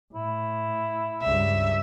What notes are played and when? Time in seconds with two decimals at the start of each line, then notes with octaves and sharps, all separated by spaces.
0.13 A2 E4
1.23 C#2 G2 E5